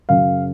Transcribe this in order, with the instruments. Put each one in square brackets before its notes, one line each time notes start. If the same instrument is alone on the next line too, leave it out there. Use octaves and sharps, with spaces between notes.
[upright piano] F#2 C#3 F#3 F5